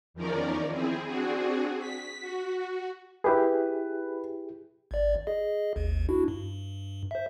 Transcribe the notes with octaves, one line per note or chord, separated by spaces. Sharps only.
E2 D#3 F3 C#4 A#4 D5
C4 E4 G#4
C4 D4 F#4 G#4
B6
F#4
E4 G4 G#4 B4
G#1 D5
G#4 D#5
G#1 D#2
D4 E4 F#4
G2
C5 E5